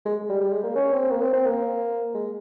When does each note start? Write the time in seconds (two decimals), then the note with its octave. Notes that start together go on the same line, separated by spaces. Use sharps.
0.06 G#3
0.29 G3
0.41 G3
0.52 G#3
0.63 A#3
0.75 C#4
0.93 C4
1.11 A#3
1.21 C4
1.33 C4
1.45 A#3
2.14 G#3